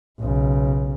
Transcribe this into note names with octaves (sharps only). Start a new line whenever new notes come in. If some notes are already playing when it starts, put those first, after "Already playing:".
B1 C#3